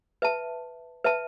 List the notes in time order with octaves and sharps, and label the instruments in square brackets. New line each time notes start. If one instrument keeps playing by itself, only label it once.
[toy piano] B4 E5 A5
B4 E5 A5